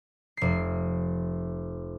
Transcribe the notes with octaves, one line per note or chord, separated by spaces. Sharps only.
F1 C7